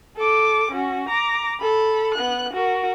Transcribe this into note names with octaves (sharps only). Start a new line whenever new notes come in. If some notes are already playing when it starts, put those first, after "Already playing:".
A4 D6
C#4 F#4
A#5 D6
A4 B5
B3 F#6
F#4 A#4